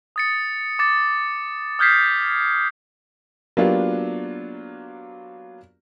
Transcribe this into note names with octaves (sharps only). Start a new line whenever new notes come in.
D#6 A6 C#7
D6 A6
D#6 F6 G6 G#6 B6 C7
F#3 A#3 B3 D4 F4 G4